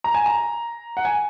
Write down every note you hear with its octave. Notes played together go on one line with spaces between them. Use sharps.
A#5
G#5
A#5
F#5
G#5